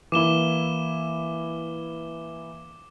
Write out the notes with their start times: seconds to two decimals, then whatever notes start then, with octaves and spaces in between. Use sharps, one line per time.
0.12 E3 A#3 E4 D6 E7 G7